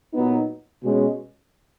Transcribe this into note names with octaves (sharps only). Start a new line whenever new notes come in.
A#2 F#3 B3 D#4
B2 G#3 C#4